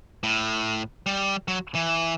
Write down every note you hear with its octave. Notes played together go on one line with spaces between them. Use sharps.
A2
G3
F#3
E3